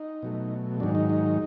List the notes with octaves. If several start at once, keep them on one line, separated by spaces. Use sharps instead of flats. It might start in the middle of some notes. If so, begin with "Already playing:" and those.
Already playing: D#4
B2 F#3 A3
G#2 D#3 F#3 D4
D#4
D#4